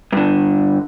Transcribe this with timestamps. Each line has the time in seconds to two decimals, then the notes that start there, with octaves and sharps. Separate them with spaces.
0.13 G2 D3